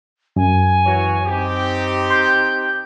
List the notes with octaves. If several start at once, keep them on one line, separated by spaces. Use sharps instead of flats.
F#2 G#5
E3 F#4 C#5
C4 D#4 G4
C6 G6